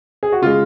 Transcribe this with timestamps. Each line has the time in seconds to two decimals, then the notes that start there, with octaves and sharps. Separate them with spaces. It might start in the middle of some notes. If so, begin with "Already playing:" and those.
0.23 G#4
0.32 F#4
0.42 C#3 G#3 F4